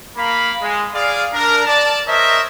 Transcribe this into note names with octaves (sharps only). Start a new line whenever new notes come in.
A#3 A#4 F5 B5
G#3
G#4 D5 F5
D4 A#4
D5 A5
A#4 C5 C#5 D#5 E5